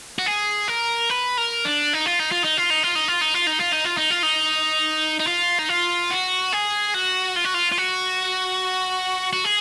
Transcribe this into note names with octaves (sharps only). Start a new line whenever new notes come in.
F#4
G#4
A#4
B4
A#4
D4
D#4
F4
D#4
F4
D#4
F4
D#4
F4
D#4
F4
D#4
F4
D#4
F4
D#4
F4
D#4
F4
D#4
D#4
F4
D#4
F4
F#4
G#4
F#4
F4
F#4
F4
F4
F#4
F#4
G#4